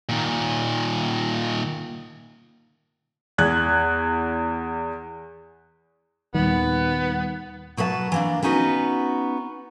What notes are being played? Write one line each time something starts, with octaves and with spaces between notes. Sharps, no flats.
A#2 D#3
E2 F#6 G#6
D#2 A#2 D#3 G3 B3
B2 F#3 B4 D#5 A5
E3 A#3 D4
B3 C#4 D#4 F#4 B4